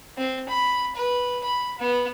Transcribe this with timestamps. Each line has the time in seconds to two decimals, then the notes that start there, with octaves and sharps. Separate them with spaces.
0.18 C4
0.49 B5
0.96 B4
1.44 B5
1.79 B3